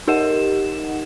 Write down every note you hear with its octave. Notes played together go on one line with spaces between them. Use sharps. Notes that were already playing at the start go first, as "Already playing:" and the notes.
D#4 G4 A#4 D#5 F#5 E7